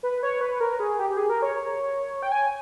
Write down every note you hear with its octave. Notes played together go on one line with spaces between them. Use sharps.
B4
C#5
B4
A#4
G#4
G4
G4
G#4
A#4
C#5
G5
G#5